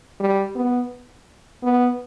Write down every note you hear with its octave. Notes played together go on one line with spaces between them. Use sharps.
G3
B3
B3